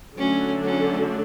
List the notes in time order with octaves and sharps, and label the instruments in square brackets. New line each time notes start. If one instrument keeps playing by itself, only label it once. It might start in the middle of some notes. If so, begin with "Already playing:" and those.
[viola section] D3 F#3 A3 D4 A4 [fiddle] C#4
[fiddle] C#4